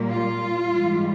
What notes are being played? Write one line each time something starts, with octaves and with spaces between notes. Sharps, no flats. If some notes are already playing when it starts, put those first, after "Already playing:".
Already playing: A#2 G3 A#3
F4
G#2 E3 G3